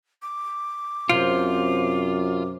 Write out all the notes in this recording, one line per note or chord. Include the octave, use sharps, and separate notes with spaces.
D6
F#2 C3 F4